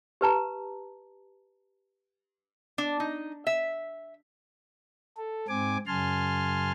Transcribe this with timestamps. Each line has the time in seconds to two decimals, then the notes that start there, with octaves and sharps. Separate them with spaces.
0.21 G4 B4 A5 A#5
2.78 D4
3.00 D#4
3.47 E5
5.17 A4
5.48 G#2 C4 G#5 D6
5.87 F#2 C#3 G#5 A5 C6 F6